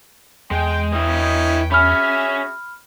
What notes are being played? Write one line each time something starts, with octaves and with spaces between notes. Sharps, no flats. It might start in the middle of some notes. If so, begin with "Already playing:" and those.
E2 G#3 G5
C#4 E4 B4 D#5 G5
C#4 F#4 G#4 E5 B5 F6